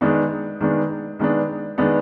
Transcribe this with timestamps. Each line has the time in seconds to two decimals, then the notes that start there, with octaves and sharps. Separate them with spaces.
0.01 D#3 G#3 B3 D4
0.61 D#3 G#3 B3 D4
1.19 D#3 G#3 B3 D4
1.78 D#3 G#3 B3 D4